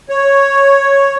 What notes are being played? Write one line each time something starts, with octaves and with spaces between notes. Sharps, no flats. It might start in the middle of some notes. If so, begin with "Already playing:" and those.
C#5